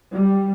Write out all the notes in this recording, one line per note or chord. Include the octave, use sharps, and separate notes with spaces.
G3